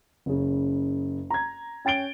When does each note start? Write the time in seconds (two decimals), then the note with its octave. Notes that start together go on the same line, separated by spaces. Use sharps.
0.26 F#1 C#3
1.30 A#5 G#6
1.85 C#4 G5 A6 D7 G7